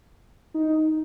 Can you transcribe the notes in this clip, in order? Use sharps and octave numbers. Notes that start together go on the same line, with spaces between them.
D#4